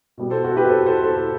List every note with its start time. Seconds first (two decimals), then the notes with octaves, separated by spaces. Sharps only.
0.18 B2 G3 B3
0.30 A4 C5
0.44 F#4 A4
0.56 G4 B4
0.69 A4 C5
0.86 A4 C5
1.04 A4 C5